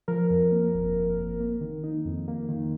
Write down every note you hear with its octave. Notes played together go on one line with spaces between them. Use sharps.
F3 A#4
F2
A#3
G1
F3
F2
A#3
D#3
D#4
F2
A#3
D#3